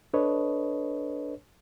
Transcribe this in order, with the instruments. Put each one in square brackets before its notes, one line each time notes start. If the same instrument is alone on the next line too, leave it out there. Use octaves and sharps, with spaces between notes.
[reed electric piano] D4 A4 B4 C#5 D#5